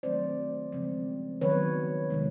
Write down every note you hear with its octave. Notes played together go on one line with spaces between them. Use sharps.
D#3 F#3 A3 C4 C5 D5
C#3 F3 G#3 C4
D#3 F#3 B3 B4 C#5
C3 D#3 G#3